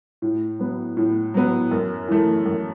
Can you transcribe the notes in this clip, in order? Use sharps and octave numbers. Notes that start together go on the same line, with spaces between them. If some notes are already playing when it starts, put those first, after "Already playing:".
A2
F#3 B3
A2
F#3 B3
F#2
E3 A3
F#2